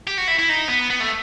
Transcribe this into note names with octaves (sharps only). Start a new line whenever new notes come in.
G4
F#4
E4
E4
D#4
B3
B3
A3